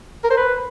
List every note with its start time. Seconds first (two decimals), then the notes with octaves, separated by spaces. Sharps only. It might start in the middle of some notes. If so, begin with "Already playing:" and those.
0.24 A#4
0.31 C5
0.37 B4